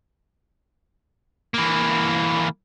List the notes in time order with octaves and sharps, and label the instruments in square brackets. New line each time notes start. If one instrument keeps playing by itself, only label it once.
[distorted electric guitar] E3 A#3